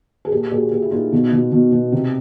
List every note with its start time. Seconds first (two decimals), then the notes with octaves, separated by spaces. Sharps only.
0.25 G#4
0.31 A#2 G4 A4
0.51 A#2 F#4 G#4
0.72 A#2 F4 G4
0.82 E4
0.91 A#2 D#4 F4
1.12 B2
1.32 B2
1.52 B2
1.72 B2
1.92 C3